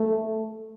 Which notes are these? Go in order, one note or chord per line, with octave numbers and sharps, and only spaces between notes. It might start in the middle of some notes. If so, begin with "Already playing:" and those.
Already playing: A3